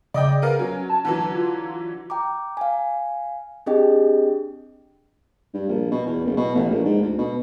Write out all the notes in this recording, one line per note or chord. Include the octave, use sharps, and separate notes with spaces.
C#3 D5 D#5 G5
B3 A#4 F5
F#3 C#4
A5
D3 E3 F#3
F4
G5 A#5 D6
F5 G#5
C4 D4 G4 G#4 D#5 G5
G2
A#1
B2
E2
F#1
B2
A1
A#1
G#2
D2
B2